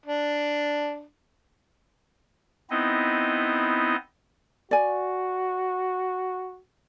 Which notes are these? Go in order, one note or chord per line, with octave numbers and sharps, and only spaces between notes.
D4
B3 C4 D#4 E4 D#5
F#4 D5 G#5